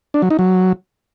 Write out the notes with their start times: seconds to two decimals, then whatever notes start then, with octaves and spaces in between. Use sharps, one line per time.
0.14 D4
0.22 F#3
0.31 D#4
0.39 F#3